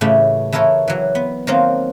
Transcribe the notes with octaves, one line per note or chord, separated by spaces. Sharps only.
A2 C#3 E3 A3 G4
E3 E4 A4 A#4 C#5
E3 F#3
B3
D#3 F3 F#3 A#3 C4